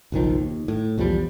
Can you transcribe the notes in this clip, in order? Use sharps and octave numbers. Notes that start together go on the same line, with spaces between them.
F#1 B1 D#3 F3
D#2
A2
B1 E2 F3 G3